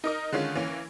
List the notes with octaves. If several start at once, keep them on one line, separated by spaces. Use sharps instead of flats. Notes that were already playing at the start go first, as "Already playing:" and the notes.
D#4 A#4 D#5
D3 D#3 G#3 C#4 F4
E3 A#3 C#4